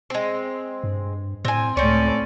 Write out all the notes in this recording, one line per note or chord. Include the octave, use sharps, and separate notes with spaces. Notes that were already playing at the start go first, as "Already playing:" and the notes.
G#3 C4
G2
A2 C4 G#5
C#2 A2 C4 C#4 D5